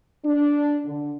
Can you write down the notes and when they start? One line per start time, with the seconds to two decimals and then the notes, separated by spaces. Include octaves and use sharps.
0.25 D4
0.85 D3